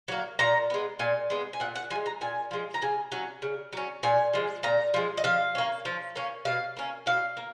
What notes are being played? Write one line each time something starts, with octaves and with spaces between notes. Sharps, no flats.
F#3 A#3
A#2 A#5
G#3 B3
A#2 G#5
G#3 B3
G#5
A#2 F#5
F#5
F3 G#5
G#3
A#5
A#2 G#5
F3 G#3
A#5
C#3 G#5
F#3 C#4
C#3
F#3 C#4
A#2 G#5
F3 G#3
A#2 A#5
F3 G#3
D#5
F3 F5
A#3 C#4
F3
A#3 C#4
B2 F5
A#3 C#4
B2 F5
A#3